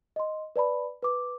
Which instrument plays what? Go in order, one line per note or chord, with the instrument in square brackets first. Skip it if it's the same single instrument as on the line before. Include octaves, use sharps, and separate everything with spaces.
[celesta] D#5 C6
B4 D5 A5 B5
B4 D6